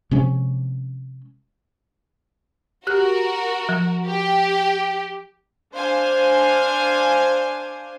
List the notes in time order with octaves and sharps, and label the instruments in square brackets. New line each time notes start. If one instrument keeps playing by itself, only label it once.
[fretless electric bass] C3 F3 G#3 C#4
[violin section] F#4 A#4 [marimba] G4 F#6
[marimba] F3
[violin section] G4
[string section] D4 C5 F5 G#5